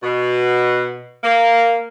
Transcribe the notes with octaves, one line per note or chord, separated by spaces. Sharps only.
B2
A#3